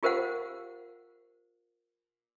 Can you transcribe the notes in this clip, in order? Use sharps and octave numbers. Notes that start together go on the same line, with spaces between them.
F4 G4 A#4 C5 F5 F#5